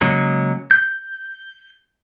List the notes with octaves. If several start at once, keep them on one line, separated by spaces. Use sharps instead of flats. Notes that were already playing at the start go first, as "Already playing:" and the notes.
C#3 F#3 G#3 A#3
G6